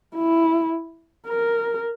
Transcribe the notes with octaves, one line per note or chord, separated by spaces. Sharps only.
E4
A#4